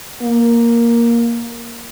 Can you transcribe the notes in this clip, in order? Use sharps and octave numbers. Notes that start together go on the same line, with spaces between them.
A#3